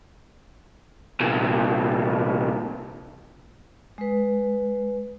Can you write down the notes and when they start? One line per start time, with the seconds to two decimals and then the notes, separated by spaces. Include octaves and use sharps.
1.20 C2 A#2
3.98 G#3 B4